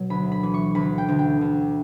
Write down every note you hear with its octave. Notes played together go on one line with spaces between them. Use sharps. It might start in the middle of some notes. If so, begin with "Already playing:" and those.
Already playing: B2 F#3
D2 B5
B5
E3
C#6
D2 B5
G5
D2
G5
D2